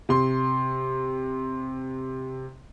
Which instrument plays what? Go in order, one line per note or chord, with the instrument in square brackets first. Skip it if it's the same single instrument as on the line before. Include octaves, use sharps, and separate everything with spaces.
[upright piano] C3 C6